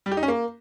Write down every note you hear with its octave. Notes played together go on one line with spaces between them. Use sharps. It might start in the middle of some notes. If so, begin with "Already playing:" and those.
G3
G4
D#4
C#4
A#3